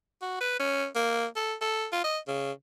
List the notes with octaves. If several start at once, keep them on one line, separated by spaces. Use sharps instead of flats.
F#4
B4
C#4
A#3
A4
A4
F4
D#5
C#3